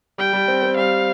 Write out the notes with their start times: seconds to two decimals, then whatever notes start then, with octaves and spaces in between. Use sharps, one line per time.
0.18 G3 G5
0.33 G3
0.48 C4
0.63 C4
0.77 G3 F5